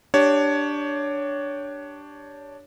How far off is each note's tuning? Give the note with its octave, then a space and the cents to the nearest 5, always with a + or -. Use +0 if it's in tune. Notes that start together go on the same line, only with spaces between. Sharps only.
D4 +0 G4 +0 C#5 +15